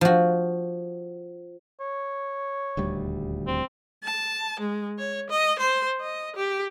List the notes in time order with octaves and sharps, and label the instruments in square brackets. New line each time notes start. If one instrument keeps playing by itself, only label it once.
[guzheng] F3 F#4
[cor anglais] C#5
[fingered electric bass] D#1 D2 G3
[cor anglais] C4
[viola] A5
G#3
C#5
D#5
C5
D#5
G4